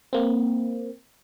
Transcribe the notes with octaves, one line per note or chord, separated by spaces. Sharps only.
A#3 C4